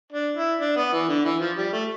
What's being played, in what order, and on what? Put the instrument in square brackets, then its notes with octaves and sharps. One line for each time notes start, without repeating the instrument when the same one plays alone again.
[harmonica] D4
E4
D4
B3
E3
D3
E3
F3
G3
A3